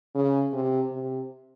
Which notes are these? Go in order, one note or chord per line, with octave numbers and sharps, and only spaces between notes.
C#3
C3
C3